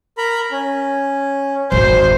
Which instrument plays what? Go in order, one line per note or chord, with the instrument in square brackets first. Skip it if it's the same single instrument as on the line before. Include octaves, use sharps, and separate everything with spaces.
[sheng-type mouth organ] A#4 A#5 B5
C#4
[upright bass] G#1 E2 [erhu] C5